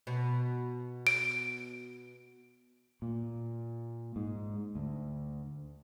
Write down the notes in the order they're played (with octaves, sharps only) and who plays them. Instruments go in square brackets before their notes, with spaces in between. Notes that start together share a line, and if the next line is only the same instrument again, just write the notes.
[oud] B2
[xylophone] D7
[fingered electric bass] A#2
G#2
D2